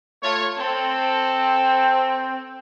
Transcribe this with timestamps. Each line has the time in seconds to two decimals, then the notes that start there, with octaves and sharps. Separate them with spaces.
0.23 A3 F4 C#5
0.58 C4 A4